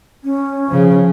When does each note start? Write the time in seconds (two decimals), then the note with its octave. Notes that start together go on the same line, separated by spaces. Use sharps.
0.24 C#4
0.68 C#3 F3